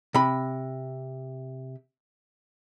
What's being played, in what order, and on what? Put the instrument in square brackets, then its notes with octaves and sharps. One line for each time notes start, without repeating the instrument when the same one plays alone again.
[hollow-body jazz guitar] C3 B5